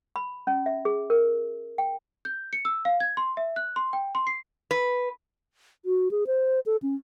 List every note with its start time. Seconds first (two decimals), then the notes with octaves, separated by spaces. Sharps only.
0.16 B5
0.47 C#4
0.66 E5
0.85 G#4
1.10 A#4
1.78 G5
2.25 G6
2.53 C#7
2.65 E6
2.85 F5
3.00 G#6
3.17 C6
3.37 E5
3.56 F#6
3.76 C6
3.93 G5
4.15 C6
4.27 C7
4.71 B4
5.85 F#4
6.11 G#4
6.27 C5
6.66 A4
6.82 C#4